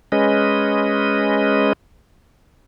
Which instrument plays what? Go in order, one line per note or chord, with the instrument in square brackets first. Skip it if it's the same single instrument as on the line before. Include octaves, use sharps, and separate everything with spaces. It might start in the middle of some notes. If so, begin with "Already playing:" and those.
[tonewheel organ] G#3 C#4 B4 D#5